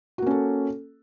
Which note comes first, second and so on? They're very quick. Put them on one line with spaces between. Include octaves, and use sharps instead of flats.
F#4 A#3 C#4 A4